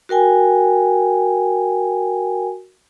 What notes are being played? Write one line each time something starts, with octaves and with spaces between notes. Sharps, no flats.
F#4 A#4 G5 G#5